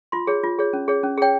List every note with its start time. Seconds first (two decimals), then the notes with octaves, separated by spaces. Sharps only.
0.12 F4 C6
0.27 G#4 C#5
0.44 F4
0.59 G#4 C#5
0.73 C#4
0.88 G#4 C#5
1.03 C#4
1.18 G#4 C#5 G5